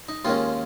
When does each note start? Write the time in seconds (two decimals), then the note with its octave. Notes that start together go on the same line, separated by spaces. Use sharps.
0.09 D#4
0.25 D#2 D#3 G#3 C#4 F4